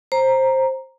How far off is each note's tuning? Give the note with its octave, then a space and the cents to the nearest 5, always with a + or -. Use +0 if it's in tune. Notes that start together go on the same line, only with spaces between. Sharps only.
C5 +15 A#5 +0